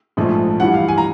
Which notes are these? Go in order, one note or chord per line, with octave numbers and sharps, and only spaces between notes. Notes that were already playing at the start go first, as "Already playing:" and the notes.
A#1 G#2 F3 A3
G2 E3 G3 F#5
F5
G#5
A#5